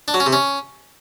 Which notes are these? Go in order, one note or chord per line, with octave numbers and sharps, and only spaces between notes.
D4
F#3
C#4
C3
C#4